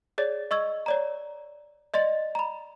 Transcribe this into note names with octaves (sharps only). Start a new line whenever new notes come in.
G#4 C#5 D5 A6
D#5 C#6 E6 G#6
C#5 D5 A#5
D5 D#5 C6 A6
A#5 B5